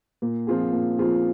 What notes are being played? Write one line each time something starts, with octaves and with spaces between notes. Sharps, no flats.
A#2
F3 C4 F4 G#4
A#2
F3 C4 F4 G#4